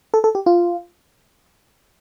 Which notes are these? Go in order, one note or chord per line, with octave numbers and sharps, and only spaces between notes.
A4
A4
G4
F4